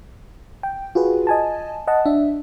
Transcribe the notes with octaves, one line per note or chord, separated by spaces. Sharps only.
G5
F4 F#4 G#4 B4
D#5 G#5 A5
D#5 F#5 A5
D4 E5